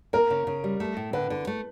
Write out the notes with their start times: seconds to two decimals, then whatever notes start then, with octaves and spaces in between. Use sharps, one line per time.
0.13 A#3 A#4
0.30 C#3
0.47 C#3
0.64 G3
0.80 A3
0.97 A2
1.13 D3 B4
1.30 D3
1.47 A3